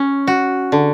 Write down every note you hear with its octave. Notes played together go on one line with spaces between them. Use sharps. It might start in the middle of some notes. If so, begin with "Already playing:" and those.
Already playing: C#4
F#4
D3